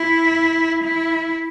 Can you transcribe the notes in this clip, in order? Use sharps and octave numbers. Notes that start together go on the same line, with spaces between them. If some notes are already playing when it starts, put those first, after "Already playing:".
Already playing: E4
E4